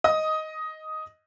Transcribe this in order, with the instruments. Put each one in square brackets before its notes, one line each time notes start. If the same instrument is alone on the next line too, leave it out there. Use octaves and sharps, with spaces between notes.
[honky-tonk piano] D#5 D#6